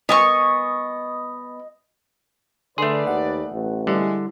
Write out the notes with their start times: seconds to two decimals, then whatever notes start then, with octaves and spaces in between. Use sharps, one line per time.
0.09 B3 D#5 G#5 C#6
2.78 D3 A3 G#4 B4 D5 C6
3.07 D#2 F#5
3.51 A1
3.87 D3 G3 G#3 E4